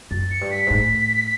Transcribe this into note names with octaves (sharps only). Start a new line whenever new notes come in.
F#2 A6
C#7
G2
B6
G#2
A2